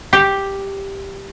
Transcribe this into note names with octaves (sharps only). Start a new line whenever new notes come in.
G4